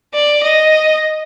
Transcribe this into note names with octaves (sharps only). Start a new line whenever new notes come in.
D5
D#5